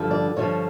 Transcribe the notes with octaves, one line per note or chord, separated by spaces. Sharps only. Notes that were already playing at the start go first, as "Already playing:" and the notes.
Already playing: G2 D3 F3
D5
G2 D3 F3 C#5